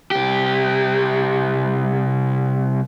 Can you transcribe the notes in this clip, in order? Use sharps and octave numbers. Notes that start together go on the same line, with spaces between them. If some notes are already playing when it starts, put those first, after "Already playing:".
C2 G4